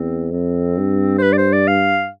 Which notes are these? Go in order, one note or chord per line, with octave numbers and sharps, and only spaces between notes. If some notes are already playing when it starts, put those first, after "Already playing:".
Already playing: E2 C4
F2 C4
G2
C5
B4
D5
C5
D5
F5